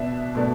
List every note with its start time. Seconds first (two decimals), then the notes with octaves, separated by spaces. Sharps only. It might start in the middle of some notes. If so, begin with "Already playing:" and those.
Already playing: B2 B3 D4 E5
0.35 B2 A3 D4